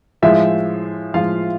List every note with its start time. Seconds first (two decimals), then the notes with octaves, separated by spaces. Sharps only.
0.22 A2 F3 G#3 E5
1.14 A2 F3 G#3 F4 F5